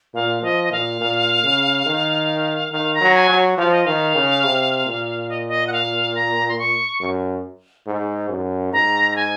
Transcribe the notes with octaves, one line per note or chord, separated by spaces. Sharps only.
A#2 F5
F3 D#5
D#5
A#2 F5
A#2
C#3
D#3
D#3 F5
A#5
F#3
G#5
F#3
F3 F5
D#5
D#3 F5
C#3
C3
A#2
D#5
D#5
F#5
F5
A#5
C6
C#6
F#2
G#2
F#2
G#2 A#5
A#5
G#5